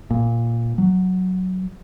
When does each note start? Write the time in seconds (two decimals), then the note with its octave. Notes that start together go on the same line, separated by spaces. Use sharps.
0.10 A#2
0.78 F#3